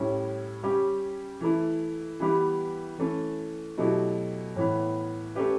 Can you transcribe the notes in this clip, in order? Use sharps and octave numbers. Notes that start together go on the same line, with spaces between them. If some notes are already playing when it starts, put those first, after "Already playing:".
Already playing: A2 G3 C#4 E4
C#3 G3 C#4 G4
E3 A3 E4
E3 G3 B3 E4 G4
E3 A3 C#4
B2 F#3 A3 E4 G4
A2 E3 B3
A3 C#4 G4 B4